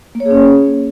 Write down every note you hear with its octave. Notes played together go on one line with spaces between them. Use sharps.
A#3
C#5
G#4
C#4